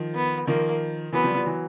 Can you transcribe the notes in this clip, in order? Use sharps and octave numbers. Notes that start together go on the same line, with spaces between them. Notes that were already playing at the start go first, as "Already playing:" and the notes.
Already playing: D#3 F3
B3
D#3 F3 A#3
E3 F#3 B3
F3 G3
F3 G3
E3 F#3